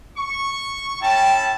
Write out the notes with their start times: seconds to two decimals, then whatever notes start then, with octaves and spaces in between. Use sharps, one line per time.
0.16 C#6
1.01 C#4 E4 G5 A5